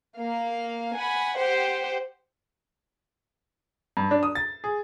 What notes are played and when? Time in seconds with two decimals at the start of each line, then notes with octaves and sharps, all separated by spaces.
0.18 A#3 F5
0.97 F#5 G#5 B5
1.38 G4 C5 F#5
3.97 G2
4.11 D4
4.23 D#6
4.35 A6
4.64 G#4